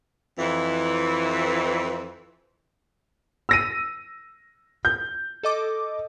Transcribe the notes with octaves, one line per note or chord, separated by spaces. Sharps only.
F2 E3
E6 A#6 D#7
G6
A4 D#5 D6